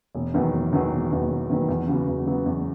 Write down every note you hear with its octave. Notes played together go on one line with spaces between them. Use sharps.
E1
E2 D#3 F#3 B3
E1
E2 D#3 F#3 B3
E1
E2 D#3 F#3 B3
E1
E2 D#3 F#3 B3
E2
C#3 F#3 B3 F#4
E2
C#3 F#3 B3 F#4
E2